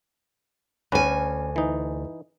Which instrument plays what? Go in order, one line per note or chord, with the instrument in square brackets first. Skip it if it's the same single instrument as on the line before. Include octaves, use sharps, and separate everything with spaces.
[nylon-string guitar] D2 G#5 [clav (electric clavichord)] C#4 B4
[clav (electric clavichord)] E3 D#4